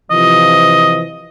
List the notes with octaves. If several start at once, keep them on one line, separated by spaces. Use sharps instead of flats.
C3 E3 F3 D#5